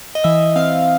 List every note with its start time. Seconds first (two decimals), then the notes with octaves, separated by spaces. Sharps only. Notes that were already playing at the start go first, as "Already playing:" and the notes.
0.15 D#5
0.24 E3 E5
0.56 C4 F5